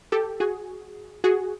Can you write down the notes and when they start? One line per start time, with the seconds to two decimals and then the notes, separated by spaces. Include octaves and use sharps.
0.12 G4 A4
0.40 F#4 G#4
1.24 F#4 G#4